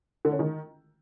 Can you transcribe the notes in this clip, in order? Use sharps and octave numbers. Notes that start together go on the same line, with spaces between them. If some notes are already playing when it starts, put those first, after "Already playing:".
D3
C#4
D#3